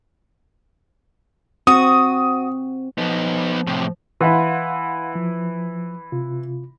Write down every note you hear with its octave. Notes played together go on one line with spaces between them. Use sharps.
C4 F#4 D#6
F3 B3 D#4
A2 C3
E3 E4 F5 F#5 C6
F3
C3 F4